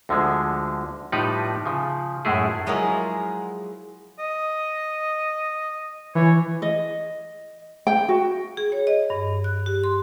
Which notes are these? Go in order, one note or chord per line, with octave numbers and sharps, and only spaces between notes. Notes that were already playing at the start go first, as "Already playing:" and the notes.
D2 D3 F3 G#3
A2 F3 G3 D#4 B4 D5
C#3 F3
F#2 A2 G#3 A3 E4 G#4
F3 F#3 G#3 E4 G#4 A#4
D#5
E3 C#5
D#5
G5
F#4
G#4
C#5
D#5
G2
F#6
G4
C6